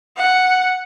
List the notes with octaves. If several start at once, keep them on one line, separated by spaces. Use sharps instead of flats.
F#5